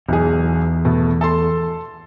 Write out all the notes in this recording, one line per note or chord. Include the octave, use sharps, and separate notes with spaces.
B1 E2 G#4
B2 A3
A4 A5 C6